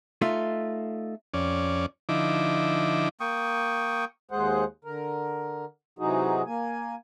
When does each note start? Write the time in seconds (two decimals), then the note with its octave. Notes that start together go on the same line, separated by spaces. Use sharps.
0.22 A3 D#4 F4
1.34 F2 C#4 D5
2.09 D3 F3 D#4 E4 D6
3.20 A#3 G5 C#6 D#6
4.31 D#2 G#3 G#4 C5 F#5
4.85 D3 A#4
5.99 C3 E3 F#3 D#4 F#4 G#4
6.46 A#3 G#5